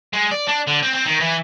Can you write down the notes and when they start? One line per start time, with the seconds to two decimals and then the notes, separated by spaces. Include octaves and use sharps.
0.13 G#3
0.31 D5
0.48 D4
0.68 D3
0.84 C4
0.95 C4
1.07 D#3
1.21 E3